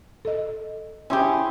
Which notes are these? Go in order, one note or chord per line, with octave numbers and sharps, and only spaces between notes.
A4 D#5
C#4 E4 G4 G#4 C6